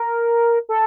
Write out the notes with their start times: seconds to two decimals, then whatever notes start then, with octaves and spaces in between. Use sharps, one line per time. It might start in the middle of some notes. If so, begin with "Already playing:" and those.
Already playing: A#4
0.69 A4